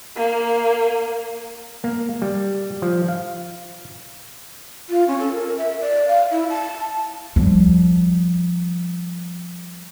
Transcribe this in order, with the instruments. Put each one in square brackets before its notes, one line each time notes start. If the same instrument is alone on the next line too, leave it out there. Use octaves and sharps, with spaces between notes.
[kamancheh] A#3
[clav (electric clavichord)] A#3
G3
F3
F5
[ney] F4
C#4
A4
A#4
E5
D5
F5
E4
A5
[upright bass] F3 G3